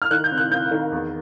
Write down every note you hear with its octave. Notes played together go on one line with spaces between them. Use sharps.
F6
D#3 F#6
G6
C4
F#6
C4 G6
D#3
E2